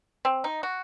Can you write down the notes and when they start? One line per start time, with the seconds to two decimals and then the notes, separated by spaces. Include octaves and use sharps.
0.25 C4
0.44 D#4
0.63 F#4